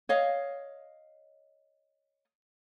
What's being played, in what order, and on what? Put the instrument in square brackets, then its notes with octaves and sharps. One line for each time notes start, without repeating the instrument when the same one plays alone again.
[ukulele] C#5 D#5 F5